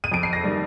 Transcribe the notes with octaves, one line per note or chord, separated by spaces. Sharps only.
D#7
F2 D7
C7
A#6
D#3 G3 A#3